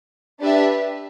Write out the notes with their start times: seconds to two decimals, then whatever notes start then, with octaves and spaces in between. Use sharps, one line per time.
0.40 D4 G4 B4 E5